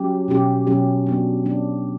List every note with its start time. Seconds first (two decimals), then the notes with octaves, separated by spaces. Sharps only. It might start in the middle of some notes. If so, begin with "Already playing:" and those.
Already playing: F#3 C#4 G4
0.28 B2 F#3 C#4 G4
0.67 B2 F#3 C#4 G4
1.06 F#3 B3 D4
1.45 F#3 B3 D4